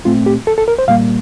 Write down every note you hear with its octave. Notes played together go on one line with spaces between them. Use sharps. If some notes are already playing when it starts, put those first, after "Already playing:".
A#2 A3 C4 F4
G4
A4
A4
A#4
C5
A#2 G3 A#3 F5